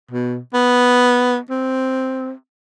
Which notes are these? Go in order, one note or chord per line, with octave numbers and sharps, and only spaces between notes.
B2
B3
C4